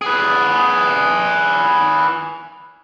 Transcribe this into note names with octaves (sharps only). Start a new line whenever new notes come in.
G#4 B4